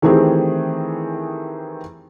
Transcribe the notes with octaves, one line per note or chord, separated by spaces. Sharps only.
D#3 E3 A3 C4 G4 G#4